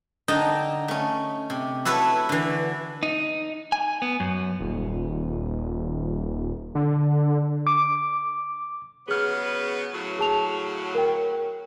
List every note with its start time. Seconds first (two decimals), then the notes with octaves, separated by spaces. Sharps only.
0.28 D3 D#4 D#5 G5 A5
0.88 A3 C#4
1.50 C3
1.85 E4 F#4 A4 B4 C#5 E5
2.29 D3 E3
3.03 D#4
3.72 G#5
4.02 B3
4.20 F#2
4.60 D#1
6.75 D3
7.67 D6
9.08 C#3 F#3 B3 G#4 F6
9.93 A2 C#3 F#3
10.19 G#4 A5 F7
10.95 A#4 G5